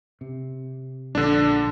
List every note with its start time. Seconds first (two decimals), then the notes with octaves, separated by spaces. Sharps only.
0.21 C3
1.15 A#1 D3 D4